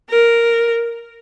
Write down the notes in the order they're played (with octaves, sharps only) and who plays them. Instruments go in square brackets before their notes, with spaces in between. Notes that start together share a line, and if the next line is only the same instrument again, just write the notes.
[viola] A#4